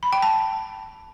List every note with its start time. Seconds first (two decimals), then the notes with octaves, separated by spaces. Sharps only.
0.03 B5
0.13 G5
0.22 A5